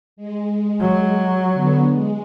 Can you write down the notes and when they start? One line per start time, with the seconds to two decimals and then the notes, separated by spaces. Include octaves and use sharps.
0.17 G#3
0.81 F#3
1.53 D3 B3
1.91 G#3